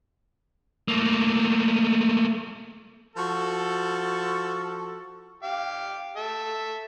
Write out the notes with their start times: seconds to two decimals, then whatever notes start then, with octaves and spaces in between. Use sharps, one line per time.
0.88 A3 A#3
3.16 F3 F#4 A4
5.43 G4 F5
6.16 A4 E5